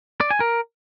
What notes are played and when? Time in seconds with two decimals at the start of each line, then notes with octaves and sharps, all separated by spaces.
0.21 D5
0.31 G#5
0.40 A#4